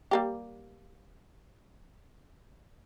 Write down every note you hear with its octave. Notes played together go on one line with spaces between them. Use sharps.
G3 A#3 G4